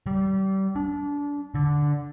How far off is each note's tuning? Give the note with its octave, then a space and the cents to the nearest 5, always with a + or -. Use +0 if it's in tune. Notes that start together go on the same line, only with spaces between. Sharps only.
G3 -30
D4 -25
D3 -5